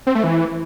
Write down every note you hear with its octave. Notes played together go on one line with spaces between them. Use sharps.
C4
A3
E3